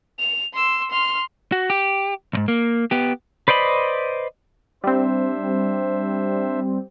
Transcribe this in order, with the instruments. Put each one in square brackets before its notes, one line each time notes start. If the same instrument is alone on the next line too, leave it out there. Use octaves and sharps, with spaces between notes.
[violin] F7
C6 E6
C6 F6
[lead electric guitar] F#4
G4
B1 G#2
A#3
B3 G4
[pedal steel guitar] B4 C5 D5 D#5 B5
[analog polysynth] G3 C4 [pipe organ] D4 C5 E5